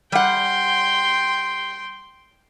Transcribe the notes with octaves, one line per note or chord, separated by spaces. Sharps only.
G3 F#5 G5 C6